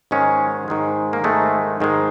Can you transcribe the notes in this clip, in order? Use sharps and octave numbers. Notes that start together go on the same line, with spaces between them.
G#2 D#3 G#3 C#4
G#2 D#3 G#3
A#3
G#2 D#3 G#3 A3
G#2 D#3 G#3